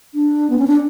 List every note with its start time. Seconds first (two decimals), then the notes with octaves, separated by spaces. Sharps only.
0.15 D4
0.50 B3
0.59 C#4
0.67 D4